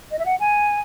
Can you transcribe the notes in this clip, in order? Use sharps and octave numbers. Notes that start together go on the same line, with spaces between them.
D#5
E5
F#5
G#5